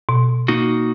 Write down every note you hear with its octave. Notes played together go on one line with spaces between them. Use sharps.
B2
A#3 D#4 F#4